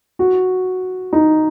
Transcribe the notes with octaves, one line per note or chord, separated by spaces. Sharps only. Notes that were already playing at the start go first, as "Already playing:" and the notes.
F#4
D#4